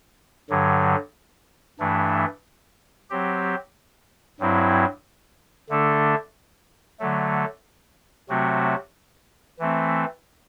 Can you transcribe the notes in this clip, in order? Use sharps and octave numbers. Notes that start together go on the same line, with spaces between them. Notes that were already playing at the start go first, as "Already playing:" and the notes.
G2 D3 F#3
G2 E3 A3 D4
F#3 C4 G4
G2 F#3 C4 E4
D3 A3 D4 A4
D3 F#3 A3
C3 F#3 A3 C4 F#4
E3 A3 C4